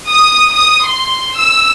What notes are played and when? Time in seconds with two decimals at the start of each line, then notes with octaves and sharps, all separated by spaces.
0.10 D#6
0.53 D#6
0.87 C6
1.38 E6